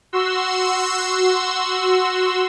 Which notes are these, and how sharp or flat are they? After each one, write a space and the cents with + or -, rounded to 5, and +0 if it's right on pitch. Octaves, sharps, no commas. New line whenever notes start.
F#4 +0 C6 +0 E6 +0